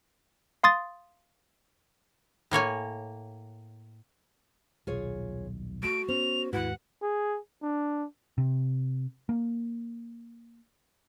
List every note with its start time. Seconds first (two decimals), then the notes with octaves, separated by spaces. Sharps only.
0.64 F5 C6 D#6 A6
2.51 A2 A#3 C#5 G#5
4.87 D#1 B1 F4 G#4 C#5
5.83 A3 F#4 D7
6.09 B3 C#4 C5 F7
6.53 D#2 G#2 E4 F#4 B4 F#5
7.02 G#4
7.62 D4
8.38 C3
9.29 A#3